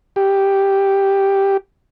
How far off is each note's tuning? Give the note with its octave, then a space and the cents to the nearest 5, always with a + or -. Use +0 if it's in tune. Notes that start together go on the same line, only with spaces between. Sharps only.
G4 +0